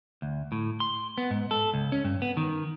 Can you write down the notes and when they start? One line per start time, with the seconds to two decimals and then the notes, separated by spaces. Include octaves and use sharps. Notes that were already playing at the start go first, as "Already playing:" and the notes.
0.22 D2
0.52 A2
0.80 C6
1.18 B3
1.31 G#2
1.51 A4
1.74 C#2
1.92 C#4
2.05 G2
2.22 B3
2.37 D#3